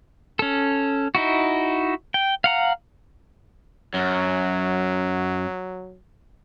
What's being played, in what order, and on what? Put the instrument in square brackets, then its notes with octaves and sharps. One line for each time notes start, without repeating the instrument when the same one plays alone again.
[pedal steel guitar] C#4 A4
D#4 E4 F#4
G5
F5 F#5 A#5
[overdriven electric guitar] F#2 [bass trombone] F#3